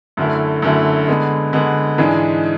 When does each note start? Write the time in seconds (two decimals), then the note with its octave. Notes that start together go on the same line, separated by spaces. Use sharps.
0.17 F#2 D3 A3 E4
0.62 F#2 D3 A3 E4
1.07 D3 G#3 B3
1.53 D3 G#3 B3
1.98 G#2 E3 G#3 D4